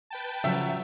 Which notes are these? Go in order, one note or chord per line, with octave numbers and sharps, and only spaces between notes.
B4 G5 A5
C#3 F3 F#3 E5